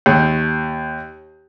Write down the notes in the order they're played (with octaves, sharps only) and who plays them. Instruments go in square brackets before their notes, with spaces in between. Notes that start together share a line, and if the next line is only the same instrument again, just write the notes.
[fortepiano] D#2